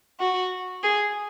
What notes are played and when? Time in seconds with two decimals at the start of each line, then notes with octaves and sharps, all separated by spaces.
0.20 F#4
0.83 G#4